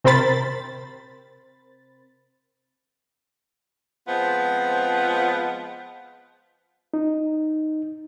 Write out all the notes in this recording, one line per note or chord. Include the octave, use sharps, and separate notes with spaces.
C3 C4 A#4 C5 B5 A6
F3 G#3 B3 C4 F4
D#4